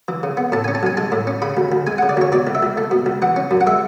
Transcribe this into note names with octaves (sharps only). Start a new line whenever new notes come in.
E3
C#3
B3
A2 A5
G#5
C#4
A5
B1 G#5
G#3 A5
A2
C#4
C#3 B5
D2
D2
G#3 G#5
F#5
C#3
D5
D2 C#5
B2 D5
C#2
E5
C#2
A3
B2
C#2
E3 F#5
C#4
F#2
F#5
G#3 E5